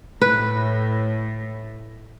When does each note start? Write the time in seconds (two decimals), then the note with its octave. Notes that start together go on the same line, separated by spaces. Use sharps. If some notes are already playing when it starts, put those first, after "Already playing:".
0.21 A2 B4